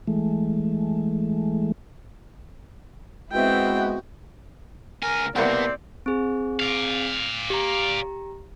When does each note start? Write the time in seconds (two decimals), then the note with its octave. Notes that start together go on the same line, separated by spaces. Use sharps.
0.07 E3 G#3 A3
3.32 G#3 B3 C4 E4 F#4 G5
5.03 C#2 A#4 G#5
5.36 C2 B2 A#3 C4 D5 F#5
6.06 C4 G#4
6.60 D5 F5
7.50 G4 A#5